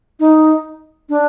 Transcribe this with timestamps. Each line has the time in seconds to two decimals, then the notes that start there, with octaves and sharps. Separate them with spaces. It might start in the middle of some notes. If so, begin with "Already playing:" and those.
0.20 D#4
1.09 D4